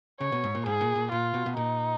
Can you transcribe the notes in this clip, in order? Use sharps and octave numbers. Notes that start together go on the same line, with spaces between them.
C#3 C#5
B2
G#2
A#2
G#2 G#4
A#2
A#2
A#2 F4
B2
B2
A#2 D#4